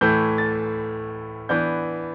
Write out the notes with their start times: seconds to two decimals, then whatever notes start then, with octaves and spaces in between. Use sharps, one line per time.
0.01 A2 E3 A3 G6
0.38 A6
1.49 E3 B3 D4 G6